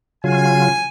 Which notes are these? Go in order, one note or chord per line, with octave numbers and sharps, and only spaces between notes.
C#3 F#3 F4 G#5